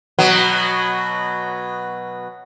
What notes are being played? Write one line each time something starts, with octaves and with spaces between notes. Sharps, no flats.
B2 F#3 B3